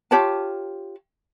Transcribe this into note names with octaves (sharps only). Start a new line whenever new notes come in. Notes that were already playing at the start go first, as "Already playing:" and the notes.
F4 G4 C#5 A5